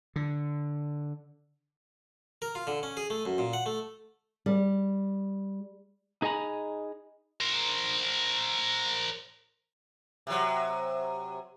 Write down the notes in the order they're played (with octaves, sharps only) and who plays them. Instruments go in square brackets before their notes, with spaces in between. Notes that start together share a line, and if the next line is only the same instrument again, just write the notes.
[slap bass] D3
[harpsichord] A#4
F4
D3
C#4
G#4
A3
F#2
A#2
F#5
A3
[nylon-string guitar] G3
[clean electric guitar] D#4 G#4 D#5 G#5 A#5 B5
[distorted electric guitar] A#4 C5
[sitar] C3 F#3